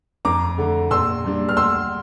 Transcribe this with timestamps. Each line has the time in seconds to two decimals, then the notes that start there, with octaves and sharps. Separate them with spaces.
0.25 F2 A#5 D6
0.58 D3 A3
0.91 A#1 C6 E6
1.24 A#2 G3 D4
1.49 F6
1.56 D2 C6 E6